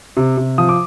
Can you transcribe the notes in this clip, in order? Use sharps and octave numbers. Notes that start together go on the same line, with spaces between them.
C3
C3
F3 D#6
D6